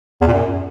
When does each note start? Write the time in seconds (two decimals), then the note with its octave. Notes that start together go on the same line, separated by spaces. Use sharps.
0.21 E2
0.27 A#2
0.33 F#2